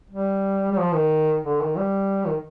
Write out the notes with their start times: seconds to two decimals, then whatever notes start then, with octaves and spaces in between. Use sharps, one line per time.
0.10 G3
0.72 G3
0.78 F3
0.94 D#3
1.45 D3
1.61 D#3
1.77 G3
2.27 D#3